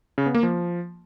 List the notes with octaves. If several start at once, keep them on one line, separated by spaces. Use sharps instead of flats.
C#3
B3
A#3
F3